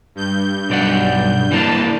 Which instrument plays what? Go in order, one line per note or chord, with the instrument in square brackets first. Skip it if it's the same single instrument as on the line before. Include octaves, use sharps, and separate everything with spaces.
[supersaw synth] G2 G6
[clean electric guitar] B1 D5 F#5
[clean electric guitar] E3 A#3 D4 [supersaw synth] A5